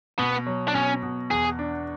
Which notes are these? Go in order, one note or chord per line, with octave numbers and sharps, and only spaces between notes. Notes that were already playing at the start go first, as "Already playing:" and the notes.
B2 B3
F#3
D4
B2 C#4
B2
E2 G#4
D4